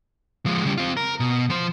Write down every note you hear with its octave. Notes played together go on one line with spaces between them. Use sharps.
F3 G#3
C#3 G3
C4 F4
A#4
B2
F3 C5